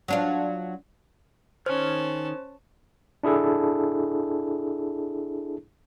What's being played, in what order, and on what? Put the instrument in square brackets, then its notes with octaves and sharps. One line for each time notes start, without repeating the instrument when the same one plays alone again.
[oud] F#3 D4 F4
[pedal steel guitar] D#3 G#4 F6 [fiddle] C#4 A5 [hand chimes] C5
[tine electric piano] D4 E4 G#4 A4